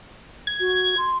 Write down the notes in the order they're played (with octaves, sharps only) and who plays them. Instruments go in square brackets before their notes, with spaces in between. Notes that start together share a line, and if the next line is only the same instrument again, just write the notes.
[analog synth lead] G#6
[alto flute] F#4
C6